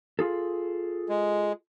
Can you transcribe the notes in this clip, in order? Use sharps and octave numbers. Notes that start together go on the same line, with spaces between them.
F4 G#4 A4
G#3